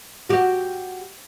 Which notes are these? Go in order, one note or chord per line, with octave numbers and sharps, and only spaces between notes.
F#4 G4